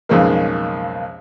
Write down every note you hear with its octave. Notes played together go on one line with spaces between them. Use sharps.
B1 F2 C#3 G#3 A#3